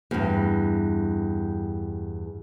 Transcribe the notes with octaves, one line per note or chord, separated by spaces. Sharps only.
E2 G2